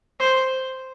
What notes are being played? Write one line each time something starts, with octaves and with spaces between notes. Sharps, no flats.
C5